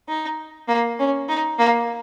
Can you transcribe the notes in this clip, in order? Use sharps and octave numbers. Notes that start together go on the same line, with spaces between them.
D#4
A#3
C#4
D#4
A#3